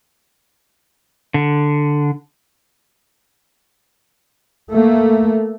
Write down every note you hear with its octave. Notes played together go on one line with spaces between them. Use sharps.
D3
A3 A#3